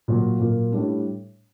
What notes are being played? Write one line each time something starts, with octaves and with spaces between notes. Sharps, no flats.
A#2 F#3 A#3
A#2 F#3 A#3
A2 G3 D4